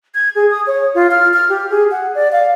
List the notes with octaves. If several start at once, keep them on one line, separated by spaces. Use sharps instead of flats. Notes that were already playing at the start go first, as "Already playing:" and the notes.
G#6
G#4
D#6
C#5
F4
F6
F6
G4
G#4
F#5
D5
F5